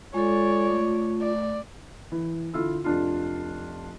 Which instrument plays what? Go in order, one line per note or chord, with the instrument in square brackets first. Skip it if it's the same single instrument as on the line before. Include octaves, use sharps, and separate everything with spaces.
[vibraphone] G#3 A4 [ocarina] F4 [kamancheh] C#5 D5
[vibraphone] A3
[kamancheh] D5
[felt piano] E3
D3 E4 F4 E6
F1 D4 F4